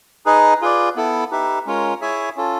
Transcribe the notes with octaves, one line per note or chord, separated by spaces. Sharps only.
D#4 G#4 B4 D#5
F4 G#4 B4 D5
B3 E4 A4
D#4 G4 B4 E5
G#3 C#4 F4 A#4 C#5
E4 G#4 C#5 E5 G#5
C#4 F4 A4